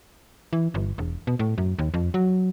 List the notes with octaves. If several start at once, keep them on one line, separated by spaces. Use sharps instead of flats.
E3
G1
E1
B2
A2
F#2
D#2
F2
F#3